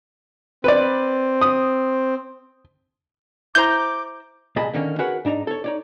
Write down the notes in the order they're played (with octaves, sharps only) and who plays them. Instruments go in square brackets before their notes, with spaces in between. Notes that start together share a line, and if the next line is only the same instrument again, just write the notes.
[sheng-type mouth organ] C4 [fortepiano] B4 D5
[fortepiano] D#6
[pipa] E4 C5 A#5 [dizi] D6 [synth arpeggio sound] G6
[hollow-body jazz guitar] C2 A#2 G#4 D#5 A5 B5
D3 D#3 A#3 C#4
F#4 G#4 A#4 B4 C#5 F#5
G#2 D4 D#4 A#5
A4 C#5
D#4 C#5 D5